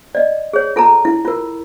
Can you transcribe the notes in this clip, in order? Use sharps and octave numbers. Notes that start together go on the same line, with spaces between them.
D5 D#5
G#4 C#5
F4 A4 A5 A#5
E4
F4 A#4